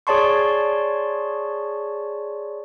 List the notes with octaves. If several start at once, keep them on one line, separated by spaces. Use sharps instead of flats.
G#4 C#5 D5 A5 C6 C#6